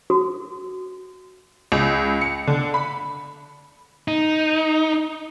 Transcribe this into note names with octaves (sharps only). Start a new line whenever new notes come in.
F#4
C#2
C#7
D3
B5
D#4